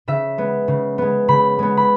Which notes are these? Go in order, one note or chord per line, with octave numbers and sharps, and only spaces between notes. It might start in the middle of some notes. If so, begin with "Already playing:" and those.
C#3 E5
G#3 B3
C#3
G#3 B3
C#3 B5
G#3 B3
B5